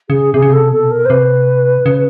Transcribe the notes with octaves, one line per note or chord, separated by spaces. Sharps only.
C#3 G#4
C3 G#4
C#3
C3 A4
B2 A4
A#4
C5
C3 B4
C#3